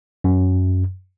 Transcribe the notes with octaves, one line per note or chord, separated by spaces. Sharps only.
F#2